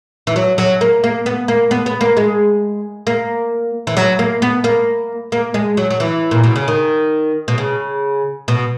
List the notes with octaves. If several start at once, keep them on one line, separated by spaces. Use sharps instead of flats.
E3
F#3
F#3
A#3
A#3
B3
A#3
B3
B3
A#3
G#3
A#3
E3
F#3
A#3
B3
A#3
A#3
G#3
F#3
F#3
E3
A#2
B2
C#3
D#3
B2
C#3
B2